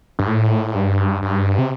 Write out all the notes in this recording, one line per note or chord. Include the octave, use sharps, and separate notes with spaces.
G2
A2
G2
G2
C3